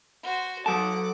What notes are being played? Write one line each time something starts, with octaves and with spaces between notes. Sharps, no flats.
F#4 C5
F#3 A4 F#5 A5 D6